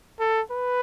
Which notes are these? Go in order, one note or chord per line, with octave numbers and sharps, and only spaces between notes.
A4
B4